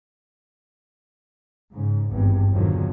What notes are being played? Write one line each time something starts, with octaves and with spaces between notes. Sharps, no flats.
G#2 C#3
G#1 E2 G2
E2 A#2 D3 D#3 F3 F#3